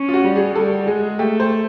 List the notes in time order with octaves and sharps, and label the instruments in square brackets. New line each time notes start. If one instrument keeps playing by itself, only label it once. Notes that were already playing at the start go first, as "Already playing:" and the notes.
Already playing: [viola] C#4
[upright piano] F4
F#4
[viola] G3
[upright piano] G#4
[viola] G3 [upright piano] A4
[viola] G#3 [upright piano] G#4
[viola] A3 [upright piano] G4
[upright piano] C5